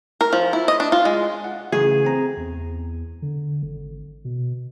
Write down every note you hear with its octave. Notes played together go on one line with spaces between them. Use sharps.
A#4
F3
E4
D#5
D4
F4
G#3
F#5
C#3 E3 A3 G#4
C4 A#5
E2
D3
G#1
B2